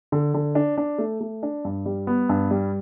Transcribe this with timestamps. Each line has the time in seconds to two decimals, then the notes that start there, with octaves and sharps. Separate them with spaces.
0.12 D3
0.34 D3
0.55 D4
0.78 D4
0.98 A3
1.21 A3
1.43 D4
1.65 G2
1.86 G3
2.07 B3
2.29 G2
2.51 G3